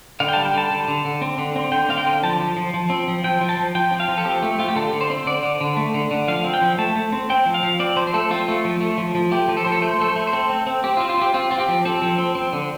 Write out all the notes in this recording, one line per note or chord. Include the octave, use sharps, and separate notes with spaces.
D3 F5
G5
G3 A5
G5
D3 A5
D3
D3
D3
C4
D3
C4
D3 G5
C4 F5
G5
D3
F3 A5
F3
F3
F3
C4
F3
F3 G5
F3
A5
F3
F3 G5
C4
F5
F3
A4
C4 G4
A3
A3 F4
G4
D3 A4
D3
C5
C4
D3 D5
D3
D3
A3
D3
D3
F3 F5
C4
G5
F3
A3 A5
A3
C4
C4 G5
F3
F5
F3
C4 D5
F3 C5
C5
A3 A4
C4 F4
A3
F3
A3
F3
F3
A3 G4
F3
A4
F3 C5
A4
A3 C5
A3 A4
C5
A3
C5
C4 A4
C4
C4
C4 G4
F4
C4
F4
C4 G4
C4 F4
C4 F4
G4
F3
C4 A4
F3
C4
C4
D3